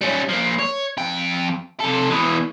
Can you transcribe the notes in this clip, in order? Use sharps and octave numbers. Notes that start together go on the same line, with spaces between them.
G3 C#4
F3 A#3
C#5
F2 G5
C3 A4
B2 E3